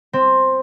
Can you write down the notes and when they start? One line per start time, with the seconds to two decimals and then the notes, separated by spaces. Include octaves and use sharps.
0.13 C4